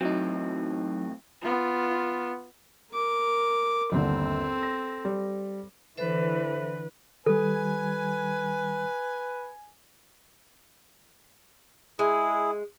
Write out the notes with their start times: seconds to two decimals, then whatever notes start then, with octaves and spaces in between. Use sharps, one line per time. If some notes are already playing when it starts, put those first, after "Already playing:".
0.01 A2 E3 F#3 C4 D#4
1.42 B3 F4
2.92 A#4 D6
3.92 G1 D#2 D3 C4 A4
4.63 A#6
5.05 G3
5.98 D3 E3 A4 B4 C5 E5
7.26 D#3 G3 A4 B4 G#5
11.99 G#3 E4 G#4